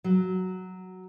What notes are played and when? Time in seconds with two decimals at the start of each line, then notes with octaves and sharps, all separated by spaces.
0.04 F#3